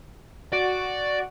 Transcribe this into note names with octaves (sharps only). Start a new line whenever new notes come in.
F#4 D5